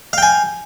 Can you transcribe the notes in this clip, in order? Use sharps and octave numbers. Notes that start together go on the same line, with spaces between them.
F5 G5 G#5